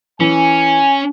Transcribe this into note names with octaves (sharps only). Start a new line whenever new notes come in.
E3 C#4 G#5